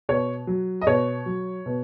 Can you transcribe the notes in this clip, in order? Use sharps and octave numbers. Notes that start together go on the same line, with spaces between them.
B2 C#5
F#3
D#5
B2 C#5
F#3
B2